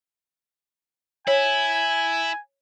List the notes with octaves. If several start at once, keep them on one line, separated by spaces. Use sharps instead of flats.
E4 C#5 G#5